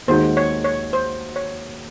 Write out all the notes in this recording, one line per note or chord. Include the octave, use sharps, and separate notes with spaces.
D#2 D#3 G#3 D#4 F#4 C5
C#5
C#5
C5
C#5